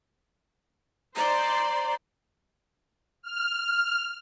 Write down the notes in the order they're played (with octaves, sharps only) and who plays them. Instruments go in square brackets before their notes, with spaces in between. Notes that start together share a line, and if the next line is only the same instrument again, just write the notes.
[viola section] C5 D5 C6 [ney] A#5
[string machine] F6